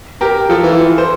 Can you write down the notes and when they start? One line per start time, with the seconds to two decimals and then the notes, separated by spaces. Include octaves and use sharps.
0.21 G4 A#4
0.49 F3 F4 A4
0.63 E3
0.98 C5